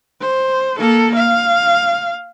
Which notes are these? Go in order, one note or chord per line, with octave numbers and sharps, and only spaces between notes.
C5
A#3 A4
F5